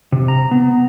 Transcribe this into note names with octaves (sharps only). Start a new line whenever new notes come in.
C3
A#5
B3